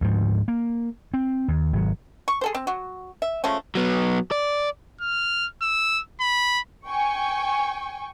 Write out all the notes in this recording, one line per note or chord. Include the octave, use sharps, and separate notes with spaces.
D2 G#2 F3
A#3
C4
D#2
G#1 F#3
C#6
G#4 A4 C5
C4
F#3 F#4
E5
F3 G#3 A3 C#4
F#3 B3
D5
F6
E6
B5
G5 G#5 C#6